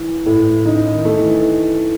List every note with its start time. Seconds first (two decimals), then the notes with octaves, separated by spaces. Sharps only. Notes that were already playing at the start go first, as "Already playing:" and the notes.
Already playing: E3
0.26 A2
0.65 C#3 D#4
0.92 D#3
1.05 A3
1.17 E3